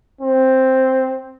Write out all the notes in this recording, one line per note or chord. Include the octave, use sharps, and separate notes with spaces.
C4